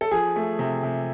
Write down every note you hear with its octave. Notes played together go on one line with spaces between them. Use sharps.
A4
F3 G#4
A3
C3
C3